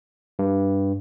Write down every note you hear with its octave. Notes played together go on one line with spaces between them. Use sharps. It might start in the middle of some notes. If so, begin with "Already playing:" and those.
G2